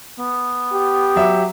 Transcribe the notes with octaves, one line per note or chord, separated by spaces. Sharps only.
B3
G4
F#3 E5